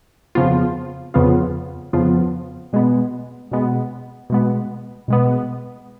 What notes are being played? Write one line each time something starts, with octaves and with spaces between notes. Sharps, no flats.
F2 C#3 F3 B3 F4
F2 C#3 F3 B3 F4
F2 C#3 F3 B3 F4
B2 G#3 B3
B2 G#3 B3
B2 G#3 B3
B2 G#3 B3